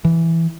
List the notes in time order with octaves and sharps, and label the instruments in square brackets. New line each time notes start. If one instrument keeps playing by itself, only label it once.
[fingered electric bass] E3